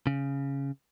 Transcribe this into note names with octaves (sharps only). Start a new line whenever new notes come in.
C#3